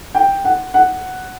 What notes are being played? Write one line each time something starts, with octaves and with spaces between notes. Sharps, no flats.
G5
F#5
F#5